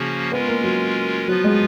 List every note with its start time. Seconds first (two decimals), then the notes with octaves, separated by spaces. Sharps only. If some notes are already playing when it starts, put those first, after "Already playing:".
Already playing: C#3 F3 A#3 C#4 F#4
0.32 G#3 B3 C#4 F4 A#4
0.48 A#3
0.63 F#3
1.27 F3 F#3 B3 F4 B4
1.44 G#3